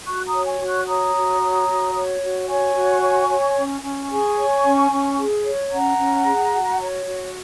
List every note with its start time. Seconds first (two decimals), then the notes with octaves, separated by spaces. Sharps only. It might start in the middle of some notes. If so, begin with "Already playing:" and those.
0.06 F#4 C#6 F#6
0.26 A#5 D#6
0.33 C#5
0.47 G#5 C#6
0.60 F#4
0.67 C#6 F#6
0.87 C#5 A#5 D#6
1.14 F#4
1.41 C#5
1.67 F#4
1.94 C#5
2.21 F#4
2.48 C#5 G#5 C#6
2.75 F#4
3.02 C#5
3.28 C#5
3.56 C#4
3.83 C#4
4.09 G#4 G#5 C#6
4.36 C#5
4.63 C#4
4.90 C#4
5.17 G#4
5.44 C#5
5.71 C#4 F#5 A#5
5.97 C#4
6.25 G#4
6.52 F#4
6.79 C#5
7.06 F#4